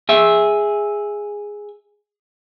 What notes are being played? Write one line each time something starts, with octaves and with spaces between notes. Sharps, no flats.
G#4 E5